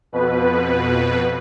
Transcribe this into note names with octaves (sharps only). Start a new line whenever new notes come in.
F2 B2 B4